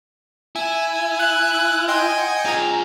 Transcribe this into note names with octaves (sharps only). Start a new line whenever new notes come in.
E4 G#5
F#6
D#5 G5 G#5 C6
F#5
F4 G#4 A#5